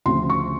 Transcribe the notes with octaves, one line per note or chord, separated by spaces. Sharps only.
D2 C#3 F3 C6
C#6